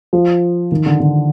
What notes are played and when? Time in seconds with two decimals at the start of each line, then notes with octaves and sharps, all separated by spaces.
0.13 F3
0.72 D#3
0.86 D3
1.00 D3